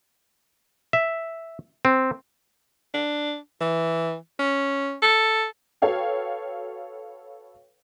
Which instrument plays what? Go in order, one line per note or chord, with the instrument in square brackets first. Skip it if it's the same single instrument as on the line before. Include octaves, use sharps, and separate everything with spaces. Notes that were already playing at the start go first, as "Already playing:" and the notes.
[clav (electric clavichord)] E5
C4
[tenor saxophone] D4
E3
C#4
A4
[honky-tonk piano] F#4 A4 B4 C#5 F5 G5